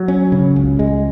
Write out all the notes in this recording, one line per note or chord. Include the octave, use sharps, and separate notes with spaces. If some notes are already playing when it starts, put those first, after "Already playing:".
Already playing: F#3
C#4
C#3
C#2
G#3